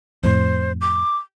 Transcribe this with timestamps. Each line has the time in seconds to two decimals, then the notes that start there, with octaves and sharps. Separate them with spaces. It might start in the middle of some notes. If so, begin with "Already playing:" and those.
0.23 F2 A2 C5
0.81 D6